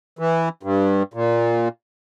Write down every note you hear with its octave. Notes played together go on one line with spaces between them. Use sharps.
E3
G2
A#2